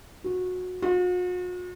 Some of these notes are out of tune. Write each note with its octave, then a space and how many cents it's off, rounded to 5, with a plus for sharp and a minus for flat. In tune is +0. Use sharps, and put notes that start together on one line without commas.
F#4 -20
F#4 -45